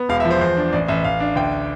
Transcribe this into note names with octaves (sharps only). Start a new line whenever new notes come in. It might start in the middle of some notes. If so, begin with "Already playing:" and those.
Already playing: B3
E1 F5
E5
F3
C5
E2 C5
D4
A1 D5
A1 E5
A1 F5
D4
D2 G5